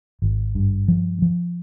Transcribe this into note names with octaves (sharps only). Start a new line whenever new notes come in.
G#1
G2
F3
F3